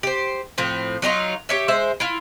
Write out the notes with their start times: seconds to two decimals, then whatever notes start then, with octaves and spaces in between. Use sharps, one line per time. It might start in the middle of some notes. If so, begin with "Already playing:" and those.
0.03 G4 C5
0.58 A2 F3 C4
1.02 F#3 D4 D#4 F4
1.49 G4 C#5 E5
1.68 G#3 C5 E5
2.00 E4 F4